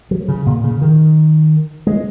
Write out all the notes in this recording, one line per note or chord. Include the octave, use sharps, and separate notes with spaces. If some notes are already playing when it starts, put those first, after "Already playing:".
F#3
C#3
A#2
C#3
D#3
G#3